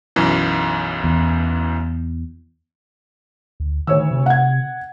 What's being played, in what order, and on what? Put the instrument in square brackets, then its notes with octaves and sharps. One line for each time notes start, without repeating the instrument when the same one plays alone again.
[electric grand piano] B1 F#2 E3
[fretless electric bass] E2
[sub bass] D2
[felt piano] D2 C#5 E6 [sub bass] D#3
[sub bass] C3
[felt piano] F#5 G#6